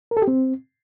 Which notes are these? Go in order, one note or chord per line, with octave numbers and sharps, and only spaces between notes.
A#4
A4
G4
C4